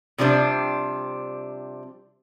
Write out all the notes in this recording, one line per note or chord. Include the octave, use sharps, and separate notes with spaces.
C3 F3 G3 D4 C5